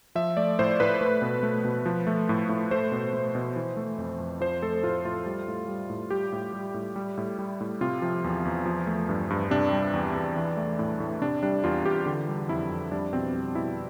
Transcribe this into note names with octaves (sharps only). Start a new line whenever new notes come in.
F3 E5
A3 D5
A2 C5
A2 B4
A3
B2
A3
B2
F3
A3
A2
A2
A3 C5
B2
A3
B2
E3
A3
F2
F2
F3 C5
A3 A4
A2 F4
A2 F4
G3
A2
G3
A2
G3 G4
A2
G3
A2
G3
A2
G3
A2
C3 F4
F3
E2
E2
F3
A3
G2
G2
C3 D4
G3
E2
E2
E3
A3
A2
A2
C3 D4
G3 D4
E2 F4
E2 G4
D3
G3
F2 E4
F2
G3 D4
B2 C4
G3
B2 E4